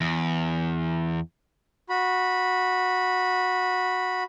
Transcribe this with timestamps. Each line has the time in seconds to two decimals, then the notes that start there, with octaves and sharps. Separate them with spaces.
0.01 E2
1.89 F#4 B5